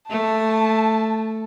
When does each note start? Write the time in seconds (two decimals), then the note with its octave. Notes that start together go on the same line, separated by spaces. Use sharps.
0.10 A3 A5